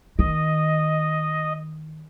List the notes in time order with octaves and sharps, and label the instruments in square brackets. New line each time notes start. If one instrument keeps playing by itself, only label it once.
[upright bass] D#3 [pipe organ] D#5